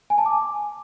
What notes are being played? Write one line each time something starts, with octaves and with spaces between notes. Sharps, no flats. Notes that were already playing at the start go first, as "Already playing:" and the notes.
G#5
A5
D6